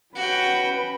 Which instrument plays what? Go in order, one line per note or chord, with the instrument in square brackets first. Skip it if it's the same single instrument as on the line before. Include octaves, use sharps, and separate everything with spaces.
[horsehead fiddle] C#4 B4 [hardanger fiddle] F#4 G5